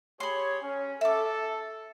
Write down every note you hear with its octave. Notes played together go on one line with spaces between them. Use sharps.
G4 G#4 C#5 B5 C6
C#4
A4 E5 D6